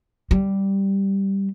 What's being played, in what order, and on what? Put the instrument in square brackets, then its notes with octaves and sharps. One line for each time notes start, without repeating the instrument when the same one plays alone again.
[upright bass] G3